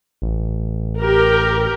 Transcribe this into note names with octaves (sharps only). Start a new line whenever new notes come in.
A1
G4 A#4